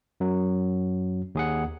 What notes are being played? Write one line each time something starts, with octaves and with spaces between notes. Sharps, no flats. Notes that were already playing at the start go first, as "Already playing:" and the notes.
F#2 F#3
D#2 G#4 F#5